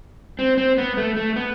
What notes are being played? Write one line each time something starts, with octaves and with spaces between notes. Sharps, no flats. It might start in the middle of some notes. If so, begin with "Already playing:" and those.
C4
C4
B3
A3
A3
B3